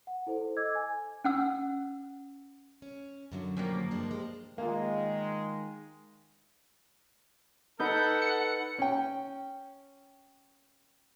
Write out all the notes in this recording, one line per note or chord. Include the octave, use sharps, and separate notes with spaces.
F#5
E4 A4 C5
A4 D#5 D6 E6 G#6
G#5
C#4 F#5 E6
C#4
F#2 D3 F#3
F3 G3 A#3
G2 G#3 D4
G#3
D#3 G#3 A#3 F4
D#4 A4 B4 F#5 G6
C#7
C#4 G5